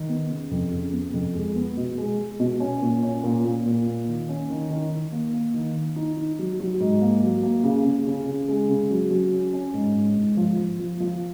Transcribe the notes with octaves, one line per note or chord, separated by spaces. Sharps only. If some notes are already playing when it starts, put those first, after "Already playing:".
Already playing: D#3
B3
C#3
F2
C#3
B3
F2
G#3
B3
B2
G#3
G#3
B2
C#4
A#2
C#4
A#2
A#2
A#2
A#3
D#3
C#4
D#3
D#3
D#3
A#3
A#3
D#3
D#3
D#4
D#4
F#3
F#3
G#2
A#3
F#3
A#3
C#3
C#3
C#3
C#3
G#3
C#3
F#3
F#3
C#4
C#4
G#2
G#2
G#2
F3
F3
F3
F3